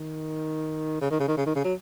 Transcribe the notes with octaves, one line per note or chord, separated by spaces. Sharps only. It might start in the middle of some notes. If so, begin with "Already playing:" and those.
Already playing: D#3
C#3
D#3
C#3
D#3
C#3
D#3
C#3
F#3